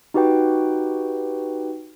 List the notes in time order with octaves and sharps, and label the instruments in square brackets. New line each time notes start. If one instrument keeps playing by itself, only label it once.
[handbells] D#4 F#4 G4 B4 G5